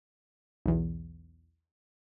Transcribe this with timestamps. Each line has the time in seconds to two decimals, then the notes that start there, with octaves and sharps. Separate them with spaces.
0.66 B1 E2